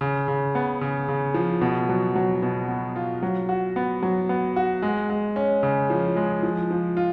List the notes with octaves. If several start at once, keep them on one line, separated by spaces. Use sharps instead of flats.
C#3
C#3
B3
C#3
C#3
F3
B2
F#3
F#3
B2
B3
F4
F#3
F#4
B3
F#3
B3
F#4
G#3
G#3
C#4
C#3
F3
G#3
F3
F3
F4